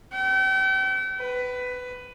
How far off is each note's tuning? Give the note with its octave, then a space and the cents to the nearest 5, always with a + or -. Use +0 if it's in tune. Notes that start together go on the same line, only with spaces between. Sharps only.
G5 -40
B4 +15